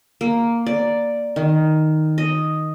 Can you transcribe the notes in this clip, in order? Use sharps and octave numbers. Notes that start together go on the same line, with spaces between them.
A#3
D5
D#3
D#5